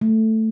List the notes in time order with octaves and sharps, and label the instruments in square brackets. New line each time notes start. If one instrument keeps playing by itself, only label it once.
[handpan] A3